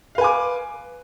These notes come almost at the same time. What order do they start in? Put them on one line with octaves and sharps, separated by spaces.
F5 B4 G#5 D6